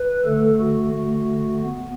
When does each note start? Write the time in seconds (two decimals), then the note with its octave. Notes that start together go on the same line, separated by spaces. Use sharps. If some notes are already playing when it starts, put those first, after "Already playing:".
Already playing: B4
0.25 D3 A3 A4
0.60 F#4
0.93 D3 A3
1.63 B3